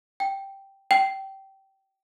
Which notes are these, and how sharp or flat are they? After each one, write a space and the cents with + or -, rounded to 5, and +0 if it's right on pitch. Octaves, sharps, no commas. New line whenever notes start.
G5 -5
G5 -20